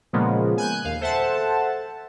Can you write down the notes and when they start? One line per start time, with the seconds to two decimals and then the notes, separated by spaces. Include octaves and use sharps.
0.13 A#2 C#3 F3 G#3 A#3 B3
0.58 G#5 F#6 G6
0.84 D#2 F5
1.01 A4 C5 E5 F#5 A5